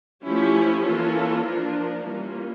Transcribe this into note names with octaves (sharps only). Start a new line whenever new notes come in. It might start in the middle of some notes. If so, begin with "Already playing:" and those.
F3 A3 C#4 E4 G4
E3 A#3 C#4 F4 A4
F3 A#3 D4 F4 A#4
E3 G3 A#3 C#4 F4